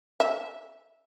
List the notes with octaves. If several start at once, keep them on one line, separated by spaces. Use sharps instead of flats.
E5